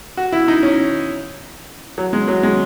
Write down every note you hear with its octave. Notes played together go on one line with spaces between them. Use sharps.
F#4
E4
D#4
C#4
F#3
G#3
F#3
G#3